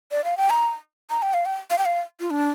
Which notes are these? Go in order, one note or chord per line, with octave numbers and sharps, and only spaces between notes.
D5
F5
G5
A#5
A#5
G5
F5
G5
F5
G5
F5
F4
D4